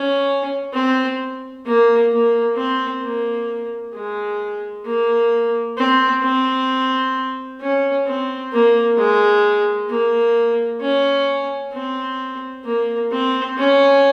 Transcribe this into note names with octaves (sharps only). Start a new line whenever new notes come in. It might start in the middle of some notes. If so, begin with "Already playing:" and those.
Already playing: C#4
C4
A#3
A#3
C4
A#3
G#3
A#3
C4
C4
C#4
C4
A#3
G#3
A#3
C#4
C4
A#3
C4
C#4